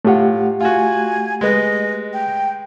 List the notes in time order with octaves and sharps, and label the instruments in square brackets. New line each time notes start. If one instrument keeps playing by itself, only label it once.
[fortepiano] A2 F4 [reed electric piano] A3 G4 F#5
[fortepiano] F4 F#4 [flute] G#5
[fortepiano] G#3 B4 [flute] D#5
[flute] G5